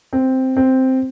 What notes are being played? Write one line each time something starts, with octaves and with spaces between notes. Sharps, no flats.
C4
C4